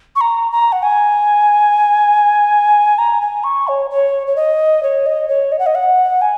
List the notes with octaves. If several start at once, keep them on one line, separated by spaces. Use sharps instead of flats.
C#6
A#5
A#5
F#5
G#5
A#5
G#5
C#6
C#5
C#5
C#5
D#5
C#5
D#5
C#5
D#5
F#5
D#5
F#5
G#5